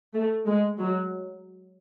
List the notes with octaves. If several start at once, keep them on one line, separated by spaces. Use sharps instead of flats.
A3
G#3
F#3